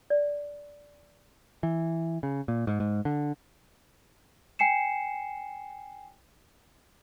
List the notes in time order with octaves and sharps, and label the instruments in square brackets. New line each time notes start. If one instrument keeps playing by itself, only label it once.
[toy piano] D5
[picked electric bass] E3
C#3
A#2
G#2
G#2
D3
[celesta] G5 G#5 C7 C#7 E7